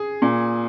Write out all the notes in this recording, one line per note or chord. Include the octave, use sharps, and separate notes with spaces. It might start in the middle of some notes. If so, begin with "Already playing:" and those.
Already playing: G#4
A#2